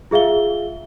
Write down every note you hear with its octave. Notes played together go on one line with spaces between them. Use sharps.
F4 G#4 E5 F5 G7